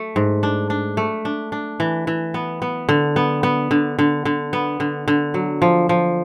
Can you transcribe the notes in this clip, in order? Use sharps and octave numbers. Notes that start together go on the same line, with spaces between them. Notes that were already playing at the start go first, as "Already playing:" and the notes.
Already playing: A3
G#2
D4
D4
A3
D4
D4
E3
E3
B3
B3
D3
B3
B3
D3
D3
D3
B3
D3
D3
F#3
F3
F3